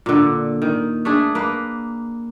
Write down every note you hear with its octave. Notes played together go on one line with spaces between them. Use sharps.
A#2 D3
D#3
A3 D4 G#4
A#3 B4